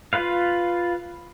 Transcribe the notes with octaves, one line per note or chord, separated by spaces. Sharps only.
F4 B4 F5